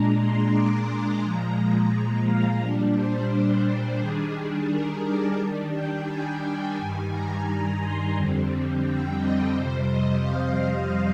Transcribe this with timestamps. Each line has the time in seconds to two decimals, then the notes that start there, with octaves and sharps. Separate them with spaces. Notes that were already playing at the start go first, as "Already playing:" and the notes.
Already playing: A#2 G#3 D4 A#5
0.18 C6
0.53 D6
0.87 C6
1.22 A#2 F3 G#3 A#5
2.26 F5
2.61 A#2 G3 D4
2.95 C5
4.00 D#3 G3 D4 G#4
4.34 G#4
4.69 A#4
5.04 D5
5.39 D#3 G3 D4
5.73 G5
6.07 G#5
6.77 G2 D#3 G3
7.12 A#5
7.46 A#5
7.81 C6
8.15 F2 D3 G3 C4
8.85 G5
9.20 D#5
9.55 F2 C3 G3 C5
9.89 D#5
10.24 F5